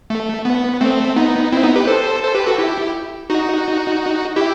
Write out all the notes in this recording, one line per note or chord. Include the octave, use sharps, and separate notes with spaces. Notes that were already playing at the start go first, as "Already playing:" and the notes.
A3
B3
A3 C4
B3 D#4
C4 E4
B3 D#4
G4 B4
A4 C5
A4 C5
G4 B4
F#4 A4
E4 G4
D#4 F#4
E4 G4